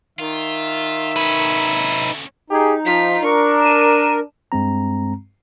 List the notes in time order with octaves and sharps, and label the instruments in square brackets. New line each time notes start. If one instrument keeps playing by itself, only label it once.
[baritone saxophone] D#3 [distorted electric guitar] F4 [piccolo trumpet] E5
[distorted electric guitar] D2 C#4 [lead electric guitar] D#4 B4
[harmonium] D#4 [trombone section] G4 G#4
[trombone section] F3 [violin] F4 B6
[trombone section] D4 [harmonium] A#4 [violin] C#6
[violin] D#7 E7
[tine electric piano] G2 G#3 C4 A#5